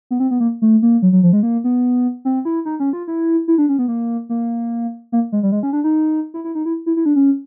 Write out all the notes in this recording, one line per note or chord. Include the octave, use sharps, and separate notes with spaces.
B3
C4
B3
A#3
A3
A#3
F#3
F#3
F3
G#3
A#3
B3
C4
E4
D#4
C#4
F4
E4
E4
D4
C#4
B3
A#3
A#3
A#3
G#3
G3
G#3
C#4
D4
D#4
E4
E4
D#4
E4
E4
E4
D4
C#4